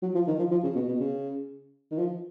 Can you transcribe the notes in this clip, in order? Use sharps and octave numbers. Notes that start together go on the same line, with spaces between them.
F#3
F3
D#3
F3
F3
C#3
B2
B2
C#3
D#3
F3